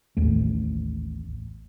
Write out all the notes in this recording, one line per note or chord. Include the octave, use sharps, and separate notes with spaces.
A1 D#2 A3